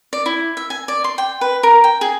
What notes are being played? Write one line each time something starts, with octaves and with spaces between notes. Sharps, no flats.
D5
E4
E5
G#5
D5
C6
G5
B4
A#4
G5
G#4